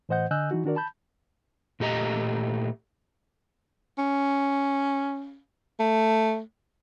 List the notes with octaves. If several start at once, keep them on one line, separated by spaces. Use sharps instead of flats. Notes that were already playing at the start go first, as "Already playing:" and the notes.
A2 E3 C5 D#5 F#5 G6
D3 D#5 G#5 E6 F#6 G6
E3 D#4 F#4
D#3 D4 F#4 A#4 D5
A5 B5 G6
A#2 A3 G4 D#5 A#5
C#4
A3